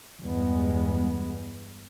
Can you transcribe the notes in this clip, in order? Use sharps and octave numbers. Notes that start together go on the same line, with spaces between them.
E2 G2 G#3 B3